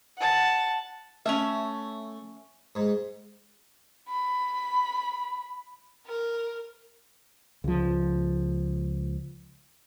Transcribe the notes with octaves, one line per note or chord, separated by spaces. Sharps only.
F#5 A5
A3 C#4 E5
G#2
B5
A#4
C#2 F3